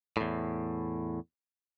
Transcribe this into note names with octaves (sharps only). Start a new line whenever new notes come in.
E2 A2